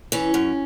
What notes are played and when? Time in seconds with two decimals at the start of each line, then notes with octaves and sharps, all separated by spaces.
0.12 E3 C#4
0.34 F#2